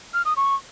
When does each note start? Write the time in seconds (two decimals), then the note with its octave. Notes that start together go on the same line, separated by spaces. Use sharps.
0.14 F6
0.25 D#6
0.37 C#6